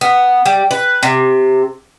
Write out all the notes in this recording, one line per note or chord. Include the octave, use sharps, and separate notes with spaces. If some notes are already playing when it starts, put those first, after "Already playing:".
B3
G3
B4
C3